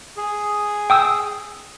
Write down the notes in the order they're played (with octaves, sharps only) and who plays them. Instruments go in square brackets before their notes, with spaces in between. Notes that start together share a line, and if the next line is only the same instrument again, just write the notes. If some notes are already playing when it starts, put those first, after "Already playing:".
[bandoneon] G#4
[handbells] G5 D#6 E6